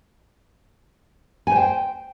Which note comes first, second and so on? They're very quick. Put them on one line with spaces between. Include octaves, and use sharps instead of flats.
G#5 C5 G5